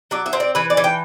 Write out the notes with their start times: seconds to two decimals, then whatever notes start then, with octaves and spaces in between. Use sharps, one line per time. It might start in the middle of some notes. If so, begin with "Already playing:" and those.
0.11 F#3 D5
0.26 E5
0.33 C4
0.40 D5
0.55 E3 B4
0.70 D5
0.77 E3
0.84 G5